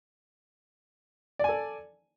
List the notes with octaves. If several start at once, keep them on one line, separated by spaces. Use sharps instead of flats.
A4 D5 G#5